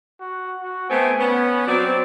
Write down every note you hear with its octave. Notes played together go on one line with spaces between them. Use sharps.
F#4
F#4
A3 B3 C4 G#5
B3 C#4
F#3 C4 D5